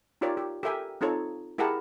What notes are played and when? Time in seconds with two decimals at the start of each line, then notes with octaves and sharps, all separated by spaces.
0.21 D#4 F4 G4 A#4 C#5 D5
0.37 G4
0.63 G4 A4 A#4 E5 G5 G#5
1.01 C4 D#4 F4 A4 C#5
1.58 E4 G4 G#4 A#4 F#5 A5